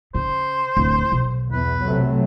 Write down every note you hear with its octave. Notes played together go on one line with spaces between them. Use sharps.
C#3 C5
D1
B1
E2 B4
C3 F#3 A3